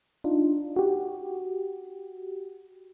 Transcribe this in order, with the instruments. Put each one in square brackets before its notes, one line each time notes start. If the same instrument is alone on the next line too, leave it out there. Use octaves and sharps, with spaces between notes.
[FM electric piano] D4 D#4 F4
F#4 G4